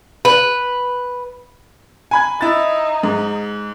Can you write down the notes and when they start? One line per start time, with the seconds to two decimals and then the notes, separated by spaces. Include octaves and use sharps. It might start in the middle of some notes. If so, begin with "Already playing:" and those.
0.25 B4
2.11 G#5 B5 G#6
2.41 D#4 E4 A6
3.03 G#2